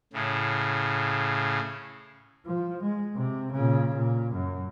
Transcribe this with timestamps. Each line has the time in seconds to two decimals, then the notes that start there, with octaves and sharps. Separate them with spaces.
0.13 A2 C#3
2.47 F3
2.83 G#3
3.15 C3
3.53 A#2 C#3
3.96 A#2
4.34 F#2